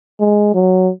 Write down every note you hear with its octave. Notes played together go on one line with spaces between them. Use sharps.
G#3
F#3